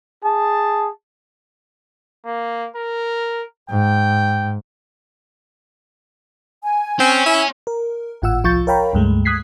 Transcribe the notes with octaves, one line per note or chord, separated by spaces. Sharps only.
G#4 A5
A#3
A#4
G#2 G5
G#5
C4 C#4
E4
A#4
G#1 A2 F4 F#5 E6
C2 F3 F4 C#6 G6 A6
A#4 C#5 F5 G5 A#5 B5
C#2 G2 G#3 A3
D#6 F#6 G#6 B6 C7